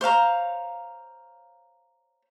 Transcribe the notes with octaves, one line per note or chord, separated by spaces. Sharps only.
C5 C#5 F5 A#5